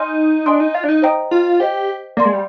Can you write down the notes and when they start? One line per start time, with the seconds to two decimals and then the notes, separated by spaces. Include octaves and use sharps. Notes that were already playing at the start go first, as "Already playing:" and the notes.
Already playing: D#4 D#5 G#5 C6 F6
0.46 D4 D#5 G#5 C6 D#6
0.60 D#4
0.75 F4
0.84 D4
0.89 D#4
1.02 C5 D#5 G5 A#5 D#6
1.31 F4
1.60 G4 C5 D#5 G5
2.17 A#3 D5 F5 C6
2.25 G#3
2.33 G3